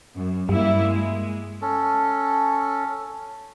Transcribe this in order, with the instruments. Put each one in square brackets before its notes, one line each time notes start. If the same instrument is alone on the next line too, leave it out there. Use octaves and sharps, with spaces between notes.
[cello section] F#2
[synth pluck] G2 [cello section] G3 A#3 E4
[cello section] G#3
[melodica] C#4 A4